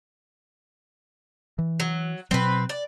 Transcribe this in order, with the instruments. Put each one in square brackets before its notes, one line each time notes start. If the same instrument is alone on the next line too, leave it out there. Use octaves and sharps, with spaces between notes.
[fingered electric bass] E3
[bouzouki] F#3
[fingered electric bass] B2 F#3 [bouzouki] C4 B4
[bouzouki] D5